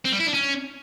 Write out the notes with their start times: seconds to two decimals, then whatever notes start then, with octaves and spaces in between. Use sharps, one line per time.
0.05 C4
0.13 G3
0.20 E4
0.27 D4
0.34 C#4